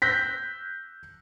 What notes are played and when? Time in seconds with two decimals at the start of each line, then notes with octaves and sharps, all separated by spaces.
0.02 E6 F#6 G6 A#6 B6